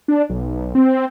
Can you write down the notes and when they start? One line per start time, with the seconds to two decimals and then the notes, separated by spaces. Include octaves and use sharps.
0.08 D4
0.29 B1
0.75 C4